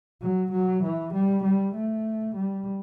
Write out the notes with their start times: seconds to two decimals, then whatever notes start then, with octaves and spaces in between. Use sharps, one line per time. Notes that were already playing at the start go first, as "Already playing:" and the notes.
0.22 F#3
0.52 F#3
0.83 E3
1.14 G3
1.44 G3
1.75 A3
2.36 G3